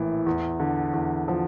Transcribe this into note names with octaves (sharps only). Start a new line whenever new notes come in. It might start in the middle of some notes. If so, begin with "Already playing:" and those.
Already playing: A#1 A2 E3 A#3
E2
D3
E2
F3